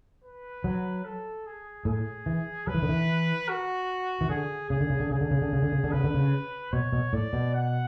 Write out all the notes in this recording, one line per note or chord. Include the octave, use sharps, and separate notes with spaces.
B4
F#3
A4
G#4
A2 G#4
E3
F#3 B4
E3
D3
E3
F#4
E3
D3 G#4
C#3 G#4
D3
C#3
D3
C#3 G#4
D3
C#3
D3
C#3
D3
C#3
D3
C#3 B4
D3
C#3
B2 C#5
B2
A2 D5
B2
F#5